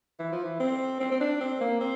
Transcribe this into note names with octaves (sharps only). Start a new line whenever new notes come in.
E3
F3
E3
C4
C4
C4
D4
C4
A#3
C4